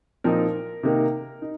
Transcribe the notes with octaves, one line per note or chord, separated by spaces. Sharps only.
A#2 F3 C4 D#4 A#4
C3 D#3 A#3 D#4
D#4